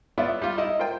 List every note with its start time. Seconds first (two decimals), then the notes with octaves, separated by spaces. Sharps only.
0.18 B3 E4 F4 C#5 D5 E5
0.42 G3 F4
0.57 D#4 E4 D#5
0.79 F4 A#4 C5 G5